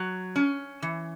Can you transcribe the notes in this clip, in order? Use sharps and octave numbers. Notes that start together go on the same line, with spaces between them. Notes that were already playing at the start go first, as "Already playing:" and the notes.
Already playing: F#3
C#4
E3